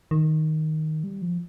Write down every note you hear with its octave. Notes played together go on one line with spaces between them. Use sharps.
D#3
G3
F3